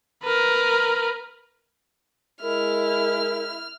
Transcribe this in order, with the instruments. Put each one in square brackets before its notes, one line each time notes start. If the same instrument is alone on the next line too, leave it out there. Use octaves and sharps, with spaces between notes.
[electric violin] A#4 B4
[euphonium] G#3 [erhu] E4 [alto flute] A#4 [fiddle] F6